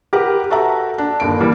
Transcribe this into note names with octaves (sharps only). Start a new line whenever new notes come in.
G4 A#4 B4 F#5
F#4 A4 E5 A#5
D4
G1 D#2 D7
E3 G3 A#3 E4